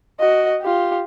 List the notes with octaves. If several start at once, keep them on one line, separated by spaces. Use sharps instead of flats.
F#4 D#5
F4 G4